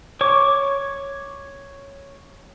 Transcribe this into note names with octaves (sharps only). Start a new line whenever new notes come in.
C#5 C#6 D6